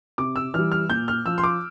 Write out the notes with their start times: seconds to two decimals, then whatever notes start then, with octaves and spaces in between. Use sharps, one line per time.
0.18 C3 D6
0.36 E6
0.54 E3 G3 F6
0.72 F6
0.90 A#2 G6
1.08 F6
1.26 F3 E6
1.38 C6
1.44 D6